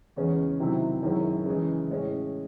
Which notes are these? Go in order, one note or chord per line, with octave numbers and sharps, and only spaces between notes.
E2 C#3 G#3 C#4
C3 D#3 F#3 C4 E4
F#2 D#3 G#3 C#4 E4
C#3 E3 G#3
A2 G#3 C#4